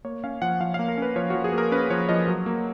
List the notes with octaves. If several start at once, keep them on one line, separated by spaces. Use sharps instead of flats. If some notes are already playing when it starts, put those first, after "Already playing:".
A#3 C#5
C#4 F5
F3 F#5
F3 F5
A#3 F5
A#4
C#4 B4
F3 C#5
F3 F#4
G#4
A#3 A#4
C#4 B4
F3 C#5
F3 D#5
F#3
A#3